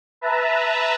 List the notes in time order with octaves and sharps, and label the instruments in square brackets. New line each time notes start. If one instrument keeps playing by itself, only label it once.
[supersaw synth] B4 E5 A5 A#5